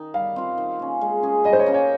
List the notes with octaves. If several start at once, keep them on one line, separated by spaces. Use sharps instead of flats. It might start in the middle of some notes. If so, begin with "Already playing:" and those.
Already playing: D#3 D#4
G3 F5
C4 F4
D#3
A#3 C#4
G#3
C#4 G#4
G3 D#5
C5
C#5
A#3 C#4
C#5